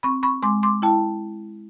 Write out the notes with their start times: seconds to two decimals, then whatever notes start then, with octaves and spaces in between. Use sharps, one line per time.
0.03 C4 B5 C#6
0.23 B5 C#6
0.43 G#3 C6 D6
0.63 C6 D6
0.82 E4 G5 A5